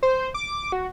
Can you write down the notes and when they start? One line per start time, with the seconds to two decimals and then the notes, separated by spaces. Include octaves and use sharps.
0.03 C5
0.34 D6
0.72 F#4